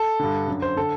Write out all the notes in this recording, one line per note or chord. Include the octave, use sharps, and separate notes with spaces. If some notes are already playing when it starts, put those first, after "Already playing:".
Already playing: A4
G2 D3
F#2 D3
C5
D3 A4